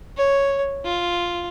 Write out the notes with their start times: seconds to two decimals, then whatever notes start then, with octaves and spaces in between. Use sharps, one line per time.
0.17 C#5
0.85 F4